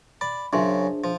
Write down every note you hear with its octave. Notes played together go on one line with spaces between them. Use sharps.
D5 B5
F#2 C#3 D4 F4 G#4 C5 E5 C6
F3